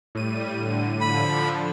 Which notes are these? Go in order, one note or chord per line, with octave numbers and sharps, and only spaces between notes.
A2 G3 D#7
D3
D3 F3 B5